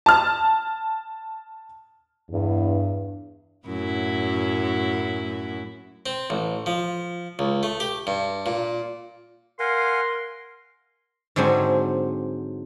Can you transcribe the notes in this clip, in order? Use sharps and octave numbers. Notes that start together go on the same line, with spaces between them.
A5 F6
E2 G2
F#2 A2 E4
C4
A1
F3
C#2
A3
G4
G2
A#2
A#4 F5 F#5 G#5 C6
G#2 D3 F#3 C4 G#5